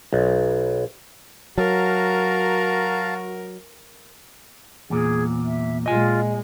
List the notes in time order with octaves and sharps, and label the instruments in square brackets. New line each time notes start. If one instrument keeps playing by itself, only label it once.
[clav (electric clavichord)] B1
[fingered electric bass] F#3 [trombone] F#4 [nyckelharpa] A#4 [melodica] F5 A5 A#5
[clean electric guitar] E2 A#2 [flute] G#4
[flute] E5
[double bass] A#2 G#3 [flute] F4 [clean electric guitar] D#5 G#5